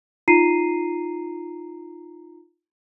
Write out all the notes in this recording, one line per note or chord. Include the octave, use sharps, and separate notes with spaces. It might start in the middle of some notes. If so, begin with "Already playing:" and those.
D#4 F4 A#5 C7 D#7